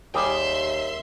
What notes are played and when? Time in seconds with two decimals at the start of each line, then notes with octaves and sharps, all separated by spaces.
0.14 D#2 G3 G#4 E5 G5 C6